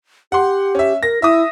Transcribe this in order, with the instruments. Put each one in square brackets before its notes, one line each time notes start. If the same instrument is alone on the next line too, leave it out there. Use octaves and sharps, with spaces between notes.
[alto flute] G4 [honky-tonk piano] F#5 C6
[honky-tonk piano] C#4 E5
[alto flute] A#4 [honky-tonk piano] A#6
[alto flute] E4 [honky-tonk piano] E5 D#6